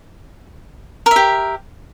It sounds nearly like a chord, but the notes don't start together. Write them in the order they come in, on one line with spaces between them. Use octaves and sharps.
A#4 E5 G4